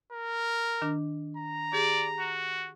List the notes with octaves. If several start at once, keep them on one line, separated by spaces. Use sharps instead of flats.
A#4
D#3 D4
A#5
G4 G#4 D5
F#4